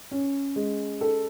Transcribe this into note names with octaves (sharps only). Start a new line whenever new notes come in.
C#4
G#3
A4